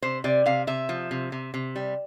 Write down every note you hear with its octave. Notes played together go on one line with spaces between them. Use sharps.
C3 C5
C3 D5
C3 F5
C3 E5
F3
C3
C3
C3
G3